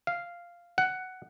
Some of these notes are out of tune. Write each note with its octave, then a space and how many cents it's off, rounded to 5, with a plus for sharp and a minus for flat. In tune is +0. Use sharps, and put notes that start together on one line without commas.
F5 -5
F#5 +10